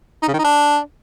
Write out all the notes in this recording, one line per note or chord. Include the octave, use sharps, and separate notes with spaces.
D#4
C#3
D#3
D#4
D4